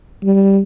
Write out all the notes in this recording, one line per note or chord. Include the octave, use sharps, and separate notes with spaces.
G3